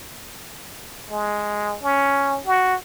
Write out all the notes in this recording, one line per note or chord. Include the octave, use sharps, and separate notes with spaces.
G#3
C#4
F#4